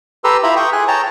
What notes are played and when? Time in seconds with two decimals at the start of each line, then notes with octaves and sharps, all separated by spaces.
0.24 G4 A4 B4 A#5 C6 E6
0.43 E4 F4 G4 E5 A#5 B5
0.56 G5 C#6 D#6
0.73 G#4 G#5 F#6
0.88 C#5 G5 A5 A#5